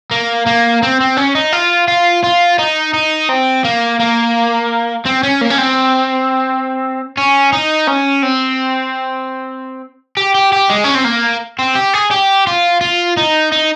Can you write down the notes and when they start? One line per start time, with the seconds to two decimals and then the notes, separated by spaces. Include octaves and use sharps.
0.11 A#3
0.46 A#3
0.83 C4
1.00 C4
1.17 C#4
1.35 D#4
1.53 F4
1.88 F4
2.23 F4
2.59 D#4
2.94 D#4
3.29 C4
3.64 A#3
4.00 A#3
5.06 C4
5.23 C#4
5.41 A#3
5.50 C#4
5.58 C4
7.18 C#4
7.53 D#4
7.87 C#4
8.22 C4
10.17 G4
10.34 G4
10.53 G4
10.69 G#3
10.84 C#4
10.95 C4
11.05 A#3
11.59 C4
11.75 G4
11.93 G#4
12.11 G4
12.47 F4
12.81 F4
13.17 D#4
13.52 D#4